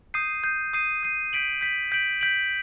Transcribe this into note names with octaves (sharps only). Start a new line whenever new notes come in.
D#6 G6 C7 D#7
D#6 G6 C7 D#7
D#6 G6 C7 D#7
D#6 G6 C7 D#7
G6 B6 D7 F#7
G6 B6 D7 F#7
G6 B6 D7 F#7
G6 B6 D7 F#7